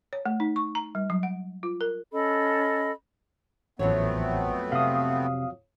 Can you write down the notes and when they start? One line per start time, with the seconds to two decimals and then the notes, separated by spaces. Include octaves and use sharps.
0.13 C#5
0.26 A3
0.40 D#4
0.56 C#6
0.75 A#5
0.95 G3
1.10 F#3
1.23 F#5
1.63 F4
1.81 A#4
2.13 C#4 A4 D#5 B5
3.79 A1 F2 F#3 A3 B3 C4 C#5
4.72 C3 F5 D#6